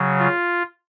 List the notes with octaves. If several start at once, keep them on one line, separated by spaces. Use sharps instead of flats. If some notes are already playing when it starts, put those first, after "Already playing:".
Already playing: C#3 F#3
F4